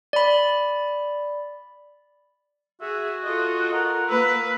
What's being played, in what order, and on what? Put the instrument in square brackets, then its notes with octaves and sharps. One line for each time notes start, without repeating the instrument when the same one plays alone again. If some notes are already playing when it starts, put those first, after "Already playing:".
[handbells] D5 B5
[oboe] F#4 [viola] G#4 [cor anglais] E5
[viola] F4 A4 [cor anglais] D#5
[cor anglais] A#4 [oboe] F#5
[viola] A#3 [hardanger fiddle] B4 [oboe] E6